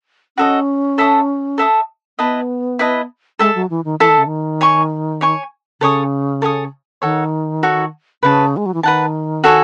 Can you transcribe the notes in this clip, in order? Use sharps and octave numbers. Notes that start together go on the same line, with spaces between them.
C#4 F#4 A4 D#5
A4 E5 A5 D#6
A4 E5 A5 D#6
B3 E4 B4 D#5 A5
E4 B4 D#5 A5
G#3 A4 E5 A5
F#3
E3
D#3
E3 A4 E5 A5
D#3
C#3
D#3
C#5 G#5 C#6
C#5 G#5 C#6
C#3 A4 C#5 G#5 D#6
A4 C#5 G#5 D#6
D#3 F#4 A4 C#5
F#4 A4 C#5
C#3 B4 F#5 A5
G#3
F#3
E3
D#3 B4 F#5 A5
F#4 A4 C#5 G#5